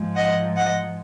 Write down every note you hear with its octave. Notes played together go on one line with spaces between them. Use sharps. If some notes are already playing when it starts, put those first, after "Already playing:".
Already playing: G#2 F3 G#3
D#5 F#5
D#5 F#5